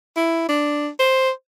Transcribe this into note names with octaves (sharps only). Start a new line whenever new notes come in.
E4
D4
C5